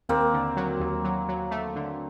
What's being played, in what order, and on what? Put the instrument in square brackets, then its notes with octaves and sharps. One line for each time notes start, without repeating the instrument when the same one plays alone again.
[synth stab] D#2 [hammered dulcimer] A#3 C4
[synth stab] D3
F#3
D#2
F#3
F#3
A3
D3